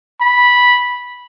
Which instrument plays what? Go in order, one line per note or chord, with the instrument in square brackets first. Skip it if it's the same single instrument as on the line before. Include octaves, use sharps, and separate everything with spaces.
[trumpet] B5